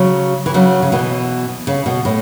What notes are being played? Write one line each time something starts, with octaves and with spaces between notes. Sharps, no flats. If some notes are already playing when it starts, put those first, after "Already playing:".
Already playing: C#3 F#3
E3
C#3 F#3
C#3
B2 E3
C#3
B2
A2